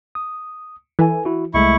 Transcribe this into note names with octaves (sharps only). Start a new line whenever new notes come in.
D#6
E3 A4 G#5
E4 F#4
C2 G#3 A3 E4 C#6